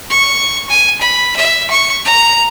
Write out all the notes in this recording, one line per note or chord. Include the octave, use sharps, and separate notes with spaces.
C#6
G#5
B5
E5
C#6
A#5